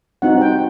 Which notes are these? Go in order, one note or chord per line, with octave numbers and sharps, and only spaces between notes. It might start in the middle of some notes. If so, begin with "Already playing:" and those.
G3 C4 D#4 F#4 F#5
G5